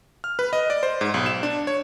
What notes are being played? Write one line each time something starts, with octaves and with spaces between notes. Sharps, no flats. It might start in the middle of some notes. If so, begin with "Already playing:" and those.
F6
B4
D#5
D5
C5
G#2
B1
E7
D4
C#5